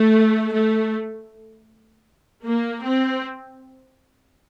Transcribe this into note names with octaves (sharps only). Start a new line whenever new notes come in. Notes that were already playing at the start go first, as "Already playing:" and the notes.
Already playing: A3
A3
A#3
C4